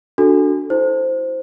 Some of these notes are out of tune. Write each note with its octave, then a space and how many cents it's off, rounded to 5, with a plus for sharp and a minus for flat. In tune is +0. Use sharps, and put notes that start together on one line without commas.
D4 +0 F#4 +0 A4 +0
E4 -20 C5 +0